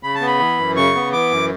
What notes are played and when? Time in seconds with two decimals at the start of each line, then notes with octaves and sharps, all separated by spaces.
0.03 C#3 B5
0.15 A5
0.21 B3
0.27 B5
0.39 E3
0.58 F#2
0.76 C#3 C#6
0.95 B3
1.13 E3 D6
1.31 F#2